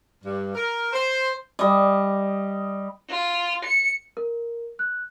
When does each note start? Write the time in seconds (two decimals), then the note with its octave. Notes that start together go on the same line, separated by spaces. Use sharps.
0.24 G2
0.55 A#4
0.93 C5
1.59 G3 D#5
3.09 F4
3.65 C#7
4.17 A#4
4.79 F#6